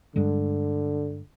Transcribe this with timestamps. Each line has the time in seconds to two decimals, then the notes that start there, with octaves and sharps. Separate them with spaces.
0.16 G2 D3 G3 G#3